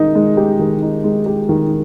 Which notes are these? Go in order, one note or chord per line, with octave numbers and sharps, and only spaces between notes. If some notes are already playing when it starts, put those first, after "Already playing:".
Already playing: D#3 G#3 D#4
G#3
G4
D#3
D#4
G#3
G4
D#3